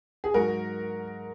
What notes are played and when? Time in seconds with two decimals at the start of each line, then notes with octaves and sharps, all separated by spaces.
0.24 G#4
0.34 G#2 F#3 F#4 A#4